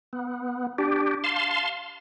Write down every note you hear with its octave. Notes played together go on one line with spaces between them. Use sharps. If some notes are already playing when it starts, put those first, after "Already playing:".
B3
D4 G4
F5 A5 C6